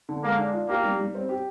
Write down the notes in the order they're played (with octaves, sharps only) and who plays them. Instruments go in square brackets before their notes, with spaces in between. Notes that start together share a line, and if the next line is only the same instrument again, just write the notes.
[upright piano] D3
[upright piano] G#3 [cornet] A#3
[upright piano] D4
F4
[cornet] A#3 [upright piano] G4
[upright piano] G3
G3
C4
G4